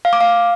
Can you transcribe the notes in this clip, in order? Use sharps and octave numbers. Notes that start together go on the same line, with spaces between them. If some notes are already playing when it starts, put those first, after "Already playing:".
F5
D6
F5